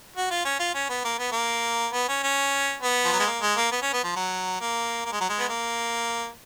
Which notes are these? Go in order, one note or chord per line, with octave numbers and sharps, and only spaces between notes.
F#4
F4
C#4
F4
C#4
B3
A#3
B3
A#3
B3
C#4
C#4
B3
F3
F#3
G#3
A#3
G#3
A#3
B3
C#4
B3
F3
F#3
A#3
A#3
G#3
F#3
G#3
B3
A#3